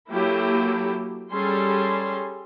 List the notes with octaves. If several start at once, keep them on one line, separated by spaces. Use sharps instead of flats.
F#3 A#3 E4 G4 A4
G3 C#4 G#4 A4 C6